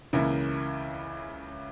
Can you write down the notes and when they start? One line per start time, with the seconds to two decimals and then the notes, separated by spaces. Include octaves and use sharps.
0.13 C#2 C#3 E3 A#3 E4